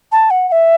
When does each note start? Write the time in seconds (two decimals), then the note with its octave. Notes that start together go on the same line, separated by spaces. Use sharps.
0.12 A5
0.31 F#5
0.49 F#5
0.52 E5